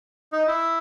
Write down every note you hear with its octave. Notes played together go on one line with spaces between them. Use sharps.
D#4
E4